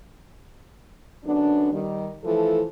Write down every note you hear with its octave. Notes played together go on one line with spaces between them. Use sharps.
F#2 D3 B3 D4
D#3 G3
E3 F3 A3 A4